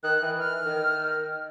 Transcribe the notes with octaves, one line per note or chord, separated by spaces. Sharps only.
D#3 F#6
E3
F6
D#3